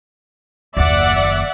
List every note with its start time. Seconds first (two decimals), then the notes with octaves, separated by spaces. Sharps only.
0.77 F#1 D#2 D5 E5 F#5